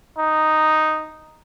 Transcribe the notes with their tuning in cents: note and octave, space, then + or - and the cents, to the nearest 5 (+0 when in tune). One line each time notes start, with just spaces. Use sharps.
D#4 +0